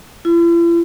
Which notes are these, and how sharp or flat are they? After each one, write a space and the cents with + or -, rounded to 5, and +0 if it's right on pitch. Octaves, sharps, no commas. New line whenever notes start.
E4 +45